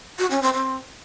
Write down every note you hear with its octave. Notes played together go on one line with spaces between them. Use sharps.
F#4
C#4
C4
C4